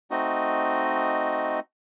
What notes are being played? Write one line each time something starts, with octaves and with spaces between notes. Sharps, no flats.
A3 C4 D#4 F#4 D#5